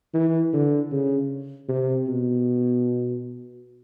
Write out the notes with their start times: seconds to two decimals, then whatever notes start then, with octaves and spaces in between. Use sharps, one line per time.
0.14 E3
0.53 D3
0.91 C#3
1.69 C3
2.08 B2